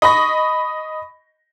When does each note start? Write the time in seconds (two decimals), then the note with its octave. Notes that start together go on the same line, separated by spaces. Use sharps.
0.02 D#5 B5 C#6 A#6